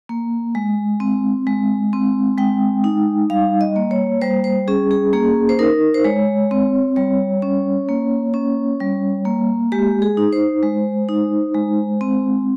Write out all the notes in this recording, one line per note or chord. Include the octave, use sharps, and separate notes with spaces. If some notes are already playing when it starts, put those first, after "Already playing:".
A#3
G#3
C4
G#3
C4
G#3 G5
D#4
G3 F5
D#5
A#3
C#5
G3 C5
C5
C#4 G#4
G#4
A#3 G#4
C5
D#4 A#4
C5
G#3 C#5
C4
G3 C#5
C#4
A#3
C#4
G3
A#3
G#3 G4
G#4
D#4
C5
G#3
D#4
G#3
C4